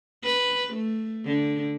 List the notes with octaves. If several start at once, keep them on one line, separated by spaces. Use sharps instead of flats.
B4
A3
D3